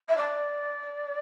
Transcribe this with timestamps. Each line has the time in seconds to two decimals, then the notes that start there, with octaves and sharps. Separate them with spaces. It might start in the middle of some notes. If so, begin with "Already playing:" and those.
0.08 E5
0.16 D5